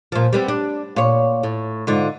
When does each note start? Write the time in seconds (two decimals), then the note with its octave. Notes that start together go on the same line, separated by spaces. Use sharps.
0.12 A#2 F3
0.33 G3 B3 C4
0.48 D4
0.96 A#2 C#5
1.43 A2
1.87 G#2 D3 F4